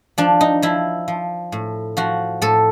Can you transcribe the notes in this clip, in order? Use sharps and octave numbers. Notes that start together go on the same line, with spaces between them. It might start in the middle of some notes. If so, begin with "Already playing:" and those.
F3 D4
D#4
F3 E4
F3
A2
F3 F#4
A2 A4